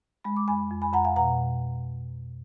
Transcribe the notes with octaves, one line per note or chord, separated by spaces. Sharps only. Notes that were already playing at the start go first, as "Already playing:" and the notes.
G#3 B5
D6
F2 G#5 B5
F2
G#5 B5
F2 F#5 A#5
F5 G#5
B2 F#5 A#5